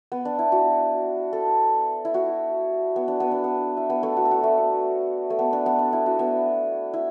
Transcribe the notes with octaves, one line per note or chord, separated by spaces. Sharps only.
B3
D4
E4
F#4
A4
E4
F#4
B3
D4
B3
D4
B3
E4
B3
A3
F#4
A4
F#4
A3
B3
A3
B3
D4
B3
D4
E4
F#4
B3
E4